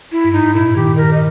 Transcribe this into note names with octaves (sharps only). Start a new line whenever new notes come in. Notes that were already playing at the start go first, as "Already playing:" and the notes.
E4
G2
G#2 D#4
A#2 E4
D#3 G4
D#3 A#4
D#5